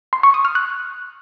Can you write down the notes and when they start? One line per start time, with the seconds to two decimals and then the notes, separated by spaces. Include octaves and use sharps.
0.13 C6
0.23 C#6
0.34 D#6
0.45 F6
0.55 F#6